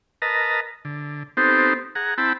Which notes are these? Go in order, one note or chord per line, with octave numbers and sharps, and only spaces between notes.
A#4 B4 D#5 A5 A#5
D3
B3 C4 D#4 G4 A4 C5
G#4 F#5 A#5
C4 E4 G5 A5 B5